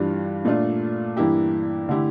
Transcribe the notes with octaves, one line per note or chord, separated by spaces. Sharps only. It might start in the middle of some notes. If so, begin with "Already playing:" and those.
Already playing: G2 E3 G3 D4 F4
A#2 A3 D4 F4
G2 E3 A#3 E4 G4
D3 A3 E4 G4